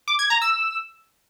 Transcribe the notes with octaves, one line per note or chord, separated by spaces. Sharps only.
D6
G#6
A#5
E6